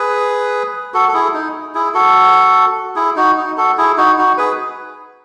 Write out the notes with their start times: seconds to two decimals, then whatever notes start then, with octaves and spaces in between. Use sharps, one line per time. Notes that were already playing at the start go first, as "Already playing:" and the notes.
Already playing: G#4 B4
0.94 F#4 A4
1.09 A4
1.14 E4 G#4
1.34 D#4
1.75 E4 G#4
1.94 F#4 A4
2.96 E4 G#4
3.16 D#4 F#4
3.38 D#4
3.57 F#4 A4
3.78 E4 G#4
3.98 D#4 F#4
4.18 D#4 F#4
4.38 G#4 B4